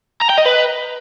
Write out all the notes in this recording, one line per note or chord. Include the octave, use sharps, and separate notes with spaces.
A#5
G5
D#5
B4